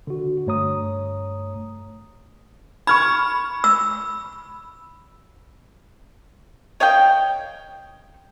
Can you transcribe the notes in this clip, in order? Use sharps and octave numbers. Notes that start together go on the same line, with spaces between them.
D3 F#4
G2 A3 C#5 A#5 D#6
B5 C#6 F6 G#6
E6
C#5 D#5 F5 G5